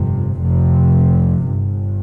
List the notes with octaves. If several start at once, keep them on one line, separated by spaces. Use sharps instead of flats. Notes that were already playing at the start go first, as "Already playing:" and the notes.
Already playing: G1 F2 C3
F1 F2 C3
G1 G2